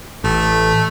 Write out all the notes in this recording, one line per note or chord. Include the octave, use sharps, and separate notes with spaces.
A1 A3